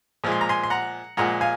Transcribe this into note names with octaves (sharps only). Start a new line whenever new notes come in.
A#2 F3 G#3
C6
A#5
G#5 C6
C6
F#5 A#5
A#2 F3 G#3 F#5 A#5
F5 G#5